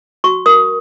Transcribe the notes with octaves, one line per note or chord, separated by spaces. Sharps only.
F#4 C#6
A#4 D#6